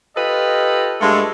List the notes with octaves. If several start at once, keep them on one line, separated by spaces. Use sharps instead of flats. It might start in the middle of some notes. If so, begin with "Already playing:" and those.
F4 G4 A4 B4 D#5
G2 G#3 A3 F4 A4